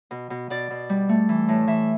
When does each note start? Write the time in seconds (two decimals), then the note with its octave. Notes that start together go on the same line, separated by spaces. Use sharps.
0.11 B2
0.30 B2
0.50 B2 D5
0.70 B2
0.89 G3
1.09 A3
1.29 E3
1.49 A2
1.67 E3 E5